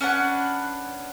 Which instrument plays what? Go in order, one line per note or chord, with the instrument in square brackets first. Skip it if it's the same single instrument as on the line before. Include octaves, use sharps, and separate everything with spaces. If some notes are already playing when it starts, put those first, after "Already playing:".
[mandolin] C#4 D4 B4 F#5